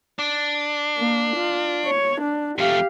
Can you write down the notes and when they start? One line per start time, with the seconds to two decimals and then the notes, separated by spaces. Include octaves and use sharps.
0.19 D4
0.98 A#3
1.36 F4
1.86 C#5
2.21 D4
2.58 F2 A3 G4 F5